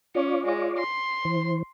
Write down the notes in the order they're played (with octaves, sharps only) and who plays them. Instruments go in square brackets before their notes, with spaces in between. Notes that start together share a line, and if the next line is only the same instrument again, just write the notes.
[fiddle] C#4 [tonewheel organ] F4 C#5 D5
[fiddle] G#3
C6
[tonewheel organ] E3 C5